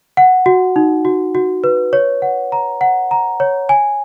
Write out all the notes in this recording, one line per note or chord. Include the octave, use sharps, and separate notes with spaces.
F#5
F#4
D#4
F#4
F#4
B4
C#5
F#5
A#5
F#5
A#5
C#5
G#5